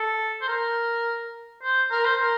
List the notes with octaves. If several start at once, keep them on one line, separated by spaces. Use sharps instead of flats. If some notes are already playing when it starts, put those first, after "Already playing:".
Already playing: A4
C5
A#4
C5
A#4
C5
A#4